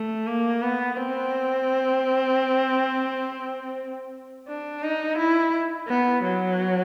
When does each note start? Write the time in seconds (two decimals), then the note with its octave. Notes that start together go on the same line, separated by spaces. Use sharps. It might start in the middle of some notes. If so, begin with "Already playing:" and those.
Already playing: A3
0.27 A#3
0.62 B3
0.97 C4
4.48 D4
4.83 D#4
5.18 E4
5.88 B3
6.24 F#3